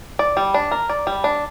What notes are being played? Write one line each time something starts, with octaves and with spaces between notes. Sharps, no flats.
D5
G3
D4
A#4
D5
G3
D4